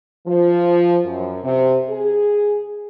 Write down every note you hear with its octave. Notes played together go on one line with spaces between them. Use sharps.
F3
F#2
C3
G#4